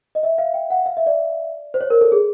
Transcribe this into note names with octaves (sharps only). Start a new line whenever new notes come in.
D#5
E5
F5
G5
F#5
F5
E5
D5
C5
C#5
A#4
A4
G#4